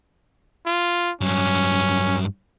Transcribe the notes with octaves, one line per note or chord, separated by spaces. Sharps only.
F4
G2 F#3 C#4